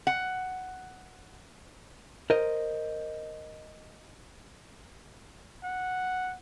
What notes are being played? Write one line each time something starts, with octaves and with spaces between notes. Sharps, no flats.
F#5
A#4 C5 D#5
F#5